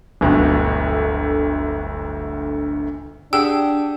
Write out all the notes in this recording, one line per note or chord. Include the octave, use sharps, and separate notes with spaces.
D1 G1 D2 B2 D3
D4 G4 G#4 F#5 G5 E6